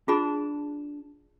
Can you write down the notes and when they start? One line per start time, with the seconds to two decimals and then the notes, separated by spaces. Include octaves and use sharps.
0.08 D4 F4 G#4 A5 B5